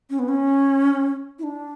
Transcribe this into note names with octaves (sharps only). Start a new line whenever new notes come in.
C#4
B3
C#4
E4
D4